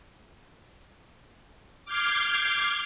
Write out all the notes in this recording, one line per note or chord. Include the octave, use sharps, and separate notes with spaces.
D6 F6 G6 G#6 C7